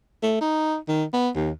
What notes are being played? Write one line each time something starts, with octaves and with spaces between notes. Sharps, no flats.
A3
D#4
D#3
B3
D#2